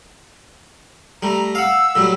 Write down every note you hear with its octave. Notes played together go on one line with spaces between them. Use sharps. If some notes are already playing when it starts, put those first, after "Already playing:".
G3 A3 A#5
F5 F#5 E6
A2 F#3 G3